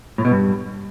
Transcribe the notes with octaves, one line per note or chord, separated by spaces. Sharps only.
A2
B2
G2